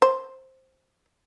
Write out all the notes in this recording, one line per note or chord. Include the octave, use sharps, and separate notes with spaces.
C5